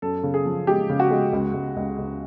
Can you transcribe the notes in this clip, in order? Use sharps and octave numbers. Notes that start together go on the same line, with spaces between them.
F#2 A4
C#3
G#4
F3
G#3 G4
C#3
F#4
G#3
C#2
C#2
C#2
C#2